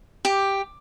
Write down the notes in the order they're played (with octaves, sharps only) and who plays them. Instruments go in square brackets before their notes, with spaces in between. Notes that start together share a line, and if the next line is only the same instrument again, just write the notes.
[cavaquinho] G4 D6